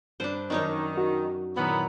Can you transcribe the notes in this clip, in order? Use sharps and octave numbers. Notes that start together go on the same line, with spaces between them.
G2 D4 B4 C5 A5
F#2 D#3 D4 D#4 C#5
F#4
A#2 D#3 E3 F#3 B3